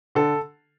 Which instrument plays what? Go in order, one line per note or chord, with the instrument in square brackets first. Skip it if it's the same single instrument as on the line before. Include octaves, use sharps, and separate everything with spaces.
[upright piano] D3 A4